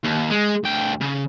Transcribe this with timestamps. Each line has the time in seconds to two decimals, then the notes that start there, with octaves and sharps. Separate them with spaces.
0.04 D#2
0.31 G#3
0.64 D2 G5
1.01 C#3